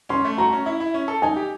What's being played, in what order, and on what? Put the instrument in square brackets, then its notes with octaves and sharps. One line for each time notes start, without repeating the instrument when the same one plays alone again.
[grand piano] C#4 [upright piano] C6
[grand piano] A3
[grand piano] F#4 [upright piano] A#5
[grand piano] C#4
E4
E4
C#4
A4
[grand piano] D#4 [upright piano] G#5
[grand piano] G4